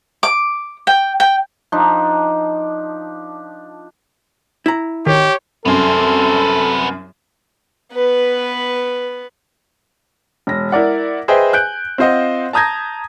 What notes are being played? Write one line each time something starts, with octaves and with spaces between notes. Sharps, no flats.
D6
G5
G5
F3 D4 D#4
E4 A#5
G#1 D#3 G4 C#5
C2 F#2 B3 A4 C5
B3 B4
E1 A#6
E4 A#4 D5 F#5
G#4 B4 C5 D#5 E5 G5
G#5 F#6 G6 D7
C4 F4 C5 D#5 F#5
A5 A#5 D#6 G6 G#6 A#6